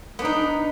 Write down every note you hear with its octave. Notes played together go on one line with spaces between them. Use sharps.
B3 D4 D#4